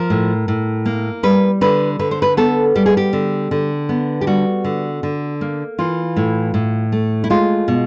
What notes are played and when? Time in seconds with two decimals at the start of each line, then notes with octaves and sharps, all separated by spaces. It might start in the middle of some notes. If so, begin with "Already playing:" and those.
Already playing: F3 A#4
0.10 A2
0.48 A2
0.86 A#3
1.23 G3 B4
1.61 D3 B4
1.99 D3 B4
2.11 C5
2.22 B4
2.37 B3 A4
2.75 G3 G4
2.86 G#4
2.97 G4
3.13 D3
3.51 D3
3.89 B3
4.21 G4
4.27 G3 F#4
4.64 D3
5.03 D3
5.41 A#3
5.79 E3 F4
6.17 A2
6.54 A2
6.92 A3
7.24 E4
7.30 G#3 F4
7.68 B2